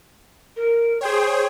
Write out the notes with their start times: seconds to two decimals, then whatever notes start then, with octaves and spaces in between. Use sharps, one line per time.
0.56 A#4
1.01 G#4 C5 C#5 G5